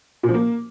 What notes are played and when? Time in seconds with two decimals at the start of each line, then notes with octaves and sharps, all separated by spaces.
0.23 A#2
0.29 F3
0.34 A#3